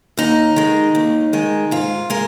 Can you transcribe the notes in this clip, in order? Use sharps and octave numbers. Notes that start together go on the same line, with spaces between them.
D#2 D#4
D#3 G#3
D#2
D#3 G#3
G#2 F4
G#3 A#4